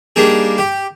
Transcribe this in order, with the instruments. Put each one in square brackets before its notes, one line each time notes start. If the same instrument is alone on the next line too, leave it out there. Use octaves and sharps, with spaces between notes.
[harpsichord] G3 A#3 D4 D#4 G#4
G4